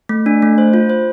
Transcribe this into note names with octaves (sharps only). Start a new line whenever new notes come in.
A3
D4
A3
C5
F4
C5